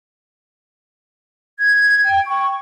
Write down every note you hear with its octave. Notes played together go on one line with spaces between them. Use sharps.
G#6
G5
C#6